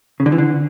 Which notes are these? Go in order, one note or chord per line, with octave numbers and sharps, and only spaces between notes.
C#3
D3
E3
D3